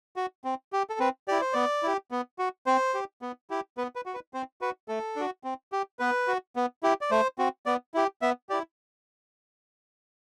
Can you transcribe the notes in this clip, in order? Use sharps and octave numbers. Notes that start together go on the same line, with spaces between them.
F#4
C4
G4
A4
C4 B4
E4 G4 D5
C5
B3 D5
E4 G4
B3
F#4
C4 C5
G4
B3
E4 G4
B3 B4
B4
F#4
B4
C4 C5
F#4 B4
A3 A4
D4 F#4
C4
G4
B3 B4
F#4
B3
E4 G4
D5
A3 C5
C4 F#4
B3 D5
E4 G4
B3 E5
E4 G4 D5